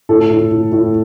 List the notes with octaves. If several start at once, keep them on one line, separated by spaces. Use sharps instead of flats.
A2 A4
A2
A2
A2